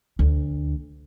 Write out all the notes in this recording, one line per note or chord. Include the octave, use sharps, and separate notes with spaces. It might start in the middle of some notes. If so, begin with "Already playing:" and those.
D2